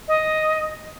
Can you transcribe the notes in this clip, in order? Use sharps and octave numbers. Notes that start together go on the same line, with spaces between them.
D#5